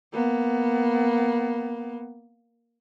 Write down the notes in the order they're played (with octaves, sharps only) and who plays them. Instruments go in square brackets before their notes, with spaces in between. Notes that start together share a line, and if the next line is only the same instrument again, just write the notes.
[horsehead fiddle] A#3 B3